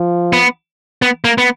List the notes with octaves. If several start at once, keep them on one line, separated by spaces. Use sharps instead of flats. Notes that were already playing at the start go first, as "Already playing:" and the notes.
Already playing: F3
B3
B3
A#3
B3